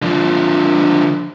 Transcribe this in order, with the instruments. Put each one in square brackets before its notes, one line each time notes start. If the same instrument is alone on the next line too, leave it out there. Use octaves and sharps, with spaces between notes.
[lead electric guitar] D3 F3